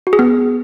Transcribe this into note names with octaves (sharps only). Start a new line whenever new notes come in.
F#4
G#4
B3